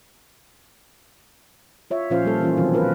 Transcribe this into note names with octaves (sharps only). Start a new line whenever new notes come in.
F4 C#5 E5
A#2 F3 C#4 F4 C5 F5
G3 A#3 A4
E3 C#4 F4
B2 D#3 F3 F#3 C4
F4 A#4 B4